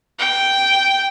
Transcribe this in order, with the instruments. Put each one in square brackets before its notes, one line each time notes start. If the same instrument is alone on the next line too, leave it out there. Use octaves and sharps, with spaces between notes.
[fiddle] G5